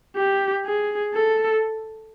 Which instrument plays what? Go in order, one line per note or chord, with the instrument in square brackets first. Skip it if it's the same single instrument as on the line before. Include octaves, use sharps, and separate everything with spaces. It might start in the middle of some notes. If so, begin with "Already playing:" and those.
[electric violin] G4
G#4
A4